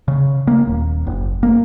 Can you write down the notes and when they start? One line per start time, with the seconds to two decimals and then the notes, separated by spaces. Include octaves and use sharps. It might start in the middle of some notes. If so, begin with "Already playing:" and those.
0.08 C#3
0.47 A#3
0.67 D#1
1.07 F#1
1.43 A#3